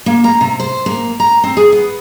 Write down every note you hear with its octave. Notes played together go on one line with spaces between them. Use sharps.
A#3
A#5
C3
C5
A#3
A#5
C4
G#4
B3